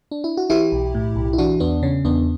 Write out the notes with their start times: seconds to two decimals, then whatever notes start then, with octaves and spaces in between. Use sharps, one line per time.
0.11 D4
0.24 E4
0.37 F#4
0.50 E3 E4 G4
0.72 B1
0.95 A2
1.16 B1
1.33 E4
1.38 E3 D4 F#4
1.60 E2 B3 D4
1.83 C#3 C#4
2.05 E2 B3 D4